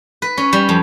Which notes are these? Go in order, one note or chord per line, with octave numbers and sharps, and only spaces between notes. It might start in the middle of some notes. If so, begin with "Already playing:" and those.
B4
C#4
G3
F2